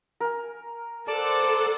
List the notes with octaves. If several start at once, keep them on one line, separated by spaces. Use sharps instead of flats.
A#4 G#5
A4 C5 D5 F#5 A5 D6